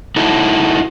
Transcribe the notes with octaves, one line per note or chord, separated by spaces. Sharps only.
D#4 E4 F#4 A4